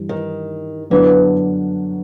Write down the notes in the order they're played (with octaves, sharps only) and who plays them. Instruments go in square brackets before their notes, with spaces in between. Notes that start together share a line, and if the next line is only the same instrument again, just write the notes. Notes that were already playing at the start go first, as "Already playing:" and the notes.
Already playing: [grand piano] G2 E3 G3
[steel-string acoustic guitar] D#3
[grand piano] F#2 D3 F#3 B3 D4 [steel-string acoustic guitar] E3